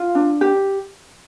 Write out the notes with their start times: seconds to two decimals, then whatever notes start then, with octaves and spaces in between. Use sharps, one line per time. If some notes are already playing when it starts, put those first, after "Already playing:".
Already playing: F4
0.15 D4
0.41 G4